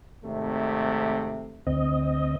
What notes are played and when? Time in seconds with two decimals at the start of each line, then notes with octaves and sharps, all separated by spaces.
0.24 G#1 C3 A3
1.67 D2 C4 D#5